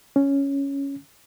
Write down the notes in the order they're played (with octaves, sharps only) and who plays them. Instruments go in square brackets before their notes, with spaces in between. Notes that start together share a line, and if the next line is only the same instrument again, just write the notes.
[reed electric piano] C#4